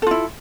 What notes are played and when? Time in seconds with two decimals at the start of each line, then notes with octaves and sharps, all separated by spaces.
0.02 A4
0.07 F4
0.11 E4